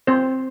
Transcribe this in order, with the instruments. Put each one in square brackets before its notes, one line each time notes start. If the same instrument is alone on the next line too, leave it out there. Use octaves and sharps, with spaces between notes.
[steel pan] C4 C5